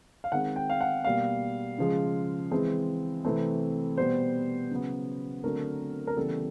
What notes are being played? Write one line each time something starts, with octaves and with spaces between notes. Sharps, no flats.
F5
D#3 G#3 C4 F#5
G5
F5
F#5
B2 G3 A#3 F5
C#3 F3 G#3
E3 G#3 C4
C3 E3 A3 C4
B2 G3 B3 C5
C#3 F#3 B3
D3 F#3 A3 C4 A#4
A#4
C#3 E3 G3 B3 A4